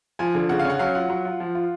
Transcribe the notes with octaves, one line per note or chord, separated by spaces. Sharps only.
F3 G#5
D3
C#3 F#5
F5
C#4 F#5
F#3 F5
F4 F#5
F#3
F4
F3
F4